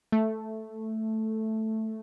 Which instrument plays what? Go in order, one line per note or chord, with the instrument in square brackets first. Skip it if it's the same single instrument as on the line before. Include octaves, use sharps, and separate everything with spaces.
[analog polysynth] A3